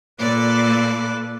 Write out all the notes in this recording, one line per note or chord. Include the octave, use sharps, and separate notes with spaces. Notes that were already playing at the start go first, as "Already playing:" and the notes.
A#2 A4 B4 D5 D6